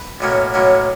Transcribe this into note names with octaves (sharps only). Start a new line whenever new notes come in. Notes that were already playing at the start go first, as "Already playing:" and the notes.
Already playing: B4
B1 A2 F#3 A#3 C#4
B1 A2 F#3 A#3 C#4